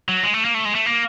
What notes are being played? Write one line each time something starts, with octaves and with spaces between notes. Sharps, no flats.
F#3
G#3
A3
A#3
A3
G#3
A3
A#3